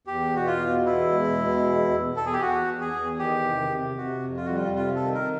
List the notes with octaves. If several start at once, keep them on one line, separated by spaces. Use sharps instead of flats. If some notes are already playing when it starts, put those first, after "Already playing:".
E2 G4
B2 F#4
F4
B2
E2 E4
G#3
B2
E2
E2
E2 A4
G#4
G4
E2 F#4
E2
G#4
E2
D#3 G4
C3
C3
C3 F#4
F2
F4
G3 F#4
F4
C3 F4
A4
D#3
A#4